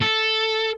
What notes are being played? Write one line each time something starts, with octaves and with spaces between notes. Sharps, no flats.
A4